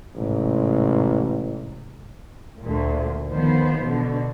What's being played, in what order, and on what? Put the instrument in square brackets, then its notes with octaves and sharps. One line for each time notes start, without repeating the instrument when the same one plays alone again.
[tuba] A1 [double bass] G#2 C3
[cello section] D2 A#2
D#2 D#3 F3 B3 C5
B2 D3